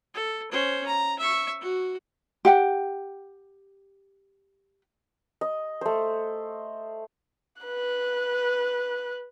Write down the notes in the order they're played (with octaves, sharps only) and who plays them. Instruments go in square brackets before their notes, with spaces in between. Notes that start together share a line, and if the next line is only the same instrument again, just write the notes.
[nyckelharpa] A4
C#4 C5
A#5
E5 C#6
F#4
[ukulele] G4 F#5 G5
[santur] D#5
A3 C5
[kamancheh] B4 F#6